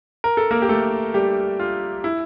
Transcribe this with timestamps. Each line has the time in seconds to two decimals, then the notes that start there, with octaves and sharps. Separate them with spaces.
0.24 A#4
0.37 A4
0.51 A#3 A#4
0.62 G4
0.69 A3 A4
1.14 G3 G4
1.60 F4
2.04 E4